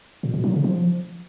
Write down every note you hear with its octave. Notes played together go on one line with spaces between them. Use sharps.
A#2
B2
F#3
C#3
F3